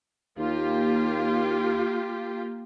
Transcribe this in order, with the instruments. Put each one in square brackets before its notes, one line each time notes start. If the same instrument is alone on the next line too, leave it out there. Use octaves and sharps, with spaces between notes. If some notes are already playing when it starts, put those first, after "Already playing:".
[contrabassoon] D#2 [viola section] A#3 F4 G4